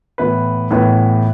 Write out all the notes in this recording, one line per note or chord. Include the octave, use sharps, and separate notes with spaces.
A2 E3 B3 E4 B4
A2 E3 B3 E4 B4